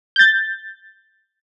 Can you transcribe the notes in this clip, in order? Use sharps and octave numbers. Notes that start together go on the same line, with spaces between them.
G6 A6